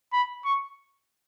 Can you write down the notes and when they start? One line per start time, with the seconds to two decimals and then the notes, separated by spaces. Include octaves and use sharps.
0.13 B5
0.45 C#6